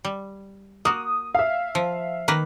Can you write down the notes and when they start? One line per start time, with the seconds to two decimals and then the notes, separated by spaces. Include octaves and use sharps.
0.05 G3
0.85 A#3 F#4 D#6
1.35 E5 F5
1.75 F3
2.28 D#3 A#3 B4